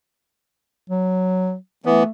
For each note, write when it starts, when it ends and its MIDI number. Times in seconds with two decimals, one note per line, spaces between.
0.90 1.55 54
1.86 2.03 52
1.86 2.10 57
1.86 2.03 59